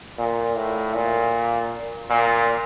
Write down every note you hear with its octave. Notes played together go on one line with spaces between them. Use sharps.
A#2
A2
A#2
A#2